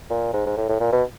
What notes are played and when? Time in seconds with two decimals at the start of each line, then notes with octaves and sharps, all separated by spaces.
0.10 A#2
0.33 G#2
0.46 G#2
0.57 A2
0.69 A2
0.81 A#2
0.92 B2